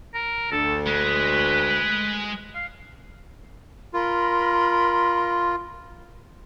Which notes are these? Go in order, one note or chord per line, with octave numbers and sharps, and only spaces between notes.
A#4
D2 A4
G#3 B4
F5
F4 A#4 B5 C6